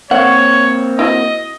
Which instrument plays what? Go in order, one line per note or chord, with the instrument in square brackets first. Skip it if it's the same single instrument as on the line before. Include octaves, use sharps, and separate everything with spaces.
[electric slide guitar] A#3 C4 [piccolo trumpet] C#5 [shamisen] F#5
[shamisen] E4 F#4 [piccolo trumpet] D#5